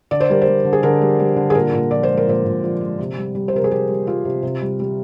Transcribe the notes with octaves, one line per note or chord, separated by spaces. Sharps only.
D3 D5
C5
G3 A#4
C5
G3
D3
G#4
D3 A#4
G3
G3
D3
G#4
A#2 A#4
A#2
F3 D5
C5
G#3
A#4
A#2 C5
A#2
F3
G#3
C3
G3
G3
C5
C3 A#4
G#4
C3 G4
G3
G3 F4
C3
C3
G3
G3